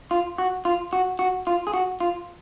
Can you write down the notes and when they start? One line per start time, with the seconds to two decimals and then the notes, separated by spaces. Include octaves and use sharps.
0.11 F4
0.38 F#4
0.65 F4
0.93 F#4
1.19 F#4
1.47 F4
1.67 G#4
1.74 F#4
2.00 F4